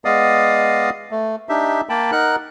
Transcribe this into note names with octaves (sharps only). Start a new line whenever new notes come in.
G#3 B3 D5 D#5 F5 D#6
A3
D4 D#4 G4 E5
A#3 G5 A5 B5
D#4 A#4 F#5 F#6